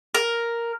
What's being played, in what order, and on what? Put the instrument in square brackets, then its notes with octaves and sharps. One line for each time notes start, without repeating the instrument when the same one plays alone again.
[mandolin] A#4